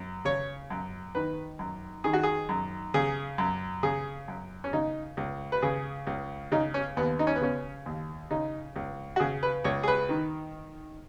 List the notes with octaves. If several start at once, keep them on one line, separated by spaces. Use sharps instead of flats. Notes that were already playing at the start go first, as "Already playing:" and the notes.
Already playing: F#2
C#3 C#5
F#2
D#3 B4
F#2
D#3 G#4
F#4
G#4
F#2
C#3 G#4
F#2
C#3 G#4
F#2
C#4
C#3 D#4
C#2
B4
C#3 G#4
C#2
C#3 D#4
C#4
D#2 B3
D#4
C#4
B3
C#3 C#4
D#2
C#3 D#4
C#2
F#4
C#3 G#4
B4
C#2 C#5
G#4
B4
D#3